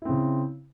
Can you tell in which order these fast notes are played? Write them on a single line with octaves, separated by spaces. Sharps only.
E4 C4 C#3